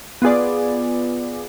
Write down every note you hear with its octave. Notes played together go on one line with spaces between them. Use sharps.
B3 F4 G#4 D5